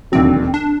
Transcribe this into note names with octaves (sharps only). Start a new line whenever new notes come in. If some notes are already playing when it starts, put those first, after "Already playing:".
E1 D#2 D3 F#3 C4
D4